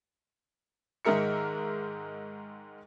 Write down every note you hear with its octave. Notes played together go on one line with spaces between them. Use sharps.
G#2 D#3 G#3 A#4 E5 C#7